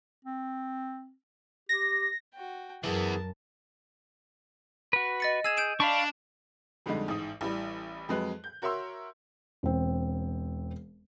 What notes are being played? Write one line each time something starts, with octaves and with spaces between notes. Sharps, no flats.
C4
G4 A#6
F#4 G5
F#2 E3 B3 G#4 A#4 A5
F#4 B4
D#5 A6 C#7
G#4 E6 G#6 E7
G6 D7 E7
D4 F5 B5 C#6
F2 D3 G3 G#3 D#4
A1 G#2 D#6
A1 E3 G3
F2 F#3 G#3 B4 F#6
G6
F#4 A#4 C#5 E5 C6 E6
E1 C4